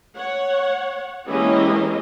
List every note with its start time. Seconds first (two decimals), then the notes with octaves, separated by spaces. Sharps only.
0.14 C#5 F#5
1.27 E3 G#3 A#3 C#4 G4 D#5